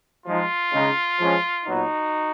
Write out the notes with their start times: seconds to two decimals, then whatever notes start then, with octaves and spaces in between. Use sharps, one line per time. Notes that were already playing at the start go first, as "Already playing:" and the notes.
0.24 F3 G#3 D#4 F4
0.72 C#3 G#3 D#4
1.19 F3 G#3 C#4
1.66 A#2 F#3 B3 D#4 F#4